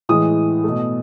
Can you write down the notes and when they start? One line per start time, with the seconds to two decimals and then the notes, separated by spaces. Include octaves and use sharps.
0.09 A2 E3 G#3 D#6
0.64 B2 A3